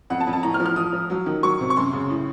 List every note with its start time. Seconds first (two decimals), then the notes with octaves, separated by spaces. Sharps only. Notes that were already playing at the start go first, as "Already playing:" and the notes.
0.10 F2 F#5
0.20 A5
0.27 F2
0.33 A5
0.43 A2 A#5
0.54 F6
0.60 F3
0.66 F6
0.76 F3 D#6
0.93 F3
1.10 F#3
1.26 D#3
1.43 F#3 C#6
1.60 C3
1.70 C#6
1.77 F#2 C6
1.93 C#3
2.10 A2